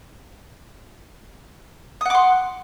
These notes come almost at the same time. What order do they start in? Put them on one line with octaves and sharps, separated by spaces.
D#6 F#5 D6 C6